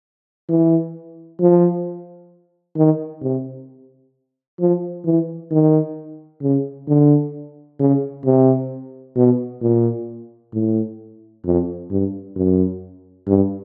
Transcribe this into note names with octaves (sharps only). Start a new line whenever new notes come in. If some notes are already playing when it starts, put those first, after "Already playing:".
E3
F3
D#3
C3
F3
E3
D#3
C#3
D3
C#3
C3
B2
A#2
A2
F2
G2
F#2
G2